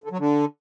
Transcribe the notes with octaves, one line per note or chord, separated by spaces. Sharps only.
D3
F#3
D3